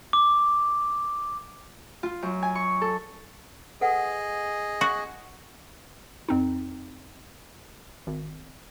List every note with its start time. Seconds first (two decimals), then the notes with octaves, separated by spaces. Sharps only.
0.13 D6
2.03 F4
2.22 F#2
2.43 G#5
2.55 C#6
2.81 A4
3.81 G#4 A4 B4 D#5 F#5
4.81 F#4
6.29 F2 C4 D#4
8.07 G#1